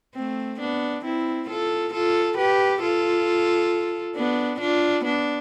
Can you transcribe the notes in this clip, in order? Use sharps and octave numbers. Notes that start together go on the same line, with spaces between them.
A3 C4
B3 D4
C4 E4
F4 A4
F4 A4
G4 B4
F4 A4
B3 D4
D4 F4
B3 D4